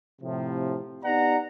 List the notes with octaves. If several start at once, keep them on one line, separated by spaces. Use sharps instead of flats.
A2 C3 F3
B3 D#4 G4 D5 F#5 A#5